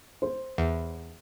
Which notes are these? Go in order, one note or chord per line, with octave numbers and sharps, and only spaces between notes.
C5
E2